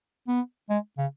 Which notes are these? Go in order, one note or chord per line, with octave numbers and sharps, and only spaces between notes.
B3
G#3
C#3